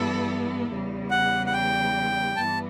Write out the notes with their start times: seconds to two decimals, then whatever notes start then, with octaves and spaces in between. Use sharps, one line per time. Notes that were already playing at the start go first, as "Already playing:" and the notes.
Already playing: G2 E3 B3 E4 A4
0.69 E2 C#3 G3
1.11 F#5
1.46 F#5
1.53 G5
2.37 G2 E3 B3 A5